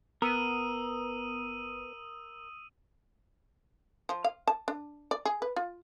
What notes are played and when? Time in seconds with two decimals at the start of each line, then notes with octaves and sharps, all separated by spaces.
0.22 F#1 B3 A#4 D#6 E6 D#7
4.09 F3
4.24 F5
4.47 A5
4.68 D4
5.11 D5
5.25 G#4
5.42 B4
5.56 F4